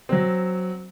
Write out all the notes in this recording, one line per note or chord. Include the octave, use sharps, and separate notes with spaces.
F#3 C4